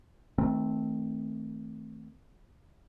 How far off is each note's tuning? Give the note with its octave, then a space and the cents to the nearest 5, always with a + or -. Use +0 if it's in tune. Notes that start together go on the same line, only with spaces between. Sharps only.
D#3 +35 A3 +0 C4 +0